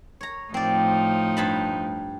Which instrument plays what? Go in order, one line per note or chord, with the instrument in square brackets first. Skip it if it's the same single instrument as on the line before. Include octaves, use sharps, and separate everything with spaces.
[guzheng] C#5 A#5
[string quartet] A2 F3 D#4 [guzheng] C4 D5
[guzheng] G2 A5 B5